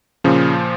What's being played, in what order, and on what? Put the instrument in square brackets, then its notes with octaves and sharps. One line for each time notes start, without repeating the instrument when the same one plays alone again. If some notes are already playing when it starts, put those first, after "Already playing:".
[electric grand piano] A#2 C#3 F3 C#4